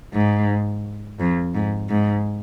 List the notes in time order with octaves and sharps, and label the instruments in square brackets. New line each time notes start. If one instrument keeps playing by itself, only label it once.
[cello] G#2
F2
G#2
G#2